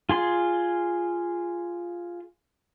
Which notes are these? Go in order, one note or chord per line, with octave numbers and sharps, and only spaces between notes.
F4 G#4 C6